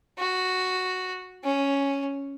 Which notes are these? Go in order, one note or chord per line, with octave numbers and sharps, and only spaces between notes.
F#4
C#4